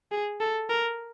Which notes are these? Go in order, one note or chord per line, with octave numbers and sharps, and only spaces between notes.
G#4
A4
A#4